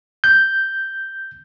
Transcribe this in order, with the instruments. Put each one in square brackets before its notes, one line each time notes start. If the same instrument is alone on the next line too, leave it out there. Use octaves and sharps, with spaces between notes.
[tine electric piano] G6